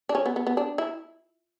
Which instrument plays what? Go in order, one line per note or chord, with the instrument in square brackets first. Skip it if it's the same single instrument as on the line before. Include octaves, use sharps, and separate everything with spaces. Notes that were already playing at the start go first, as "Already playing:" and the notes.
[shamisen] D4
C#4
B3
B3
B3
D4
E4